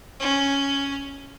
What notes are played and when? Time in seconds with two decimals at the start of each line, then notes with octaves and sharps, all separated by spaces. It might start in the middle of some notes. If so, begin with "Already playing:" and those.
0.20 C#4